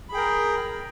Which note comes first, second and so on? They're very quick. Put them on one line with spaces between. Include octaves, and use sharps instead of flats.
B5 G#4 G5 A#4